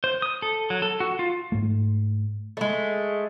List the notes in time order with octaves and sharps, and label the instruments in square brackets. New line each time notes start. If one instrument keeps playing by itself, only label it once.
[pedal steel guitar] C5
D#6
A4
F#3
A4
F#4
F4
[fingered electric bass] G#2 A3
[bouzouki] G#3 A3